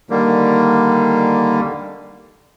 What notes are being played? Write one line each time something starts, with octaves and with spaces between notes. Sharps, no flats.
D3 D#3 G3 A#3